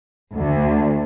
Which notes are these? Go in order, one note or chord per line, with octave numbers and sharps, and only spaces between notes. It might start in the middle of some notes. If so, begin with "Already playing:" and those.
D2